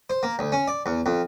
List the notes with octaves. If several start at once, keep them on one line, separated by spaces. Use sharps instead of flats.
C5
A#3
D2
C#4
D5
E2
F2